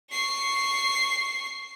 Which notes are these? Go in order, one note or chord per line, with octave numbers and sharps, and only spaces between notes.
C#6 C7